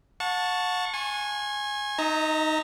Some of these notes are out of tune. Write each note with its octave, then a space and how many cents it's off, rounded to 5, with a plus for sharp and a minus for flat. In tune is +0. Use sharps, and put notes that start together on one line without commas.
F#5 -35 A5 +0 C#6 +0
G#5 -5 C#6 -45
D#4 +0 D#5 +45 A#5 -20